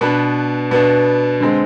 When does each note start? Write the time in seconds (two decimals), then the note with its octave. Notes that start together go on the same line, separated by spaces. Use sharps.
0.01 B2 B3 D4 B4
0.71 B2 B3 D4
1.41 D3 G#3 C4